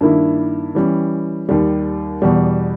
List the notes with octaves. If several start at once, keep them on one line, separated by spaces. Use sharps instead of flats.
G2 D#3 A#3 E4
E3 G3 C#4
D#2 D#3 G3
E2 B2 G3